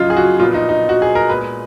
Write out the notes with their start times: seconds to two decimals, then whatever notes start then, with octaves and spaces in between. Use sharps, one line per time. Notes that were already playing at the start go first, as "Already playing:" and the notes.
Already playing: F#2 C#3 F3 D#4 F4
0.10 G#4
0.16 F#4
0.40 A#2 F3 B3 F4
0.54 D#4
0.69 D#4
0.89 F#4
1.02 G#4
1.15 A#4
1.29 A#2 G#3 B3 B4